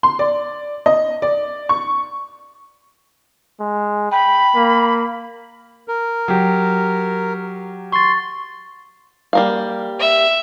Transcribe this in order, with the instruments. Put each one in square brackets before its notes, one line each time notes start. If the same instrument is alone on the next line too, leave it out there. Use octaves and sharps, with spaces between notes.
[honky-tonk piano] C6
D5
D#5
D5
C#6
[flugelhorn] G#3
[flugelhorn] G5 [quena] B5
[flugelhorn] A#3
[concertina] A#4
[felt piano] F#3 G4
[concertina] C6 [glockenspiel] C#6 A6
[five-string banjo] G3 A#3 F5
[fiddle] E5